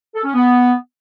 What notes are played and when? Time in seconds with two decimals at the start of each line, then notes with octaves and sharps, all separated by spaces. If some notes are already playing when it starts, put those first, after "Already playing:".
0.14 A4
0.24 C#4
0.34 B3